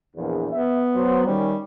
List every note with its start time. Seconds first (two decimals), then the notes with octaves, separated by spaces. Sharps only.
0.16 A#1 E2
0.51 B3 E5
0.95 F#3 C5
1.26 D#3 G3 C#4